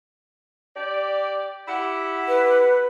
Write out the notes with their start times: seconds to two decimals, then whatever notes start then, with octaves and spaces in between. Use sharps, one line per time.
0.76 G4 D5
1.68 E4 G4 F#5
2.28 B4